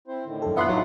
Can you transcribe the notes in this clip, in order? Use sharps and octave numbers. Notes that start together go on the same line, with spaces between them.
C4 E4 C5
A2 D3 D#3
F#2 A4
B3 D4 E4 F4 E5 C6 F#6
A1 F#3 D#4